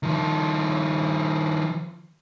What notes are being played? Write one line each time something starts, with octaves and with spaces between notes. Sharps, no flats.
D#3 F3